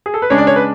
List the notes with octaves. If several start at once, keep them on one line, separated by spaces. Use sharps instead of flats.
G#4
A4
B4
C#3 G#3 D4 C#5
D5
C#5
B4